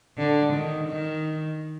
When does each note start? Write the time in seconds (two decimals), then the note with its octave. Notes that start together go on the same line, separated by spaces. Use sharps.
0.18 D3
0.53 D#3
0.88 D#3